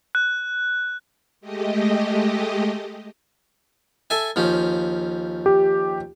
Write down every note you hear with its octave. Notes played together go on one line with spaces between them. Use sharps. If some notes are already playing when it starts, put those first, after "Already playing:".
F#6
G#3 A3 G4 D#5
A4 E5 G#5
D#2 F3 C#4
G4